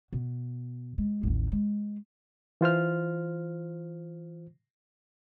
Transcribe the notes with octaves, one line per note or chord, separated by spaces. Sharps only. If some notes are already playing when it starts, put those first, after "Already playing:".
B2
G#3
A1 D#2
G#3
E3 F4 C5 F6